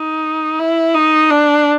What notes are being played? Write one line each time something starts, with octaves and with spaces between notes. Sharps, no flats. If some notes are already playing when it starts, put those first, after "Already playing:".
Already playing: D#4
E4
D#4
D4